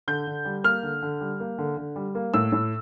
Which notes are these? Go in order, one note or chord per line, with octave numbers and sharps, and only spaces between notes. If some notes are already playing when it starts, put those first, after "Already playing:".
D3 G6
D3
G3
A#3 F6
D3
D3
G3
A#3
D3
D3
G3
A#3
A2 E6
A2